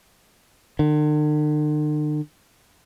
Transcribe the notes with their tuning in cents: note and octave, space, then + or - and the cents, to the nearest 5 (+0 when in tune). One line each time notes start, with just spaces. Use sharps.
D3 +45